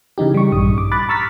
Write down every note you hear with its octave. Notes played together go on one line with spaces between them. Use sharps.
C#3 E3 D#4 G4
G3 C#6
A#1 G2 D#6
D6
B5 D6 F#6 A6
A#5 C#6 E6 F6 A6 B6